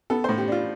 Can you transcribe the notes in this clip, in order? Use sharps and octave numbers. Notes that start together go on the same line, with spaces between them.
B3 A4
A2 C5
G4
D4 F4